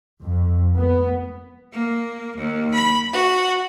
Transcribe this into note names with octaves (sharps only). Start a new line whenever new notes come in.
F2
B3
A#3
D#2
B5
F#4